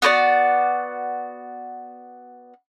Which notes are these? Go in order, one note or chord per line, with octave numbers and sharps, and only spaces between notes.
B3 F#4 C5 D5